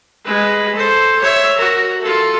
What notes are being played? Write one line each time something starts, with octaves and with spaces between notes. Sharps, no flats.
G#3 B4
A4 C5
C#5 E5
F#4 A#4
F4 A4